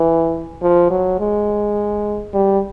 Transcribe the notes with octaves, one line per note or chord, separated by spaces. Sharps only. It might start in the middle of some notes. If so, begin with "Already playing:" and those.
Already playing: E3
F3
F#3
G#3
G3